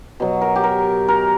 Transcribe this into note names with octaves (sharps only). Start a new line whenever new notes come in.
B2 F#3
A#4
G4
A#4
A#4